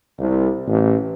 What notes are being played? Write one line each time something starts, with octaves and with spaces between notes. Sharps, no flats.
C2
A1